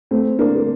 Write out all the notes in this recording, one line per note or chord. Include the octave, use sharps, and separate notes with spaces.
A3 C4
A#3 D4
A#3